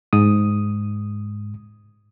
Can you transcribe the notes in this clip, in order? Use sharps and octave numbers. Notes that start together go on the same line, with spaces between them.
G#2 D#6